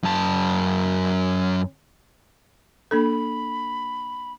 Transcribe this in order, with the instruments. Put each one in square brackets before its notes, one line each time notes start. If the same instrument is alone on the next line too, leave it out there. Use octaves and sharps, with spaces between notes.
[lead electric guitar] F#2 A5
[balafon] A#3 D4 A4 [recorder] B5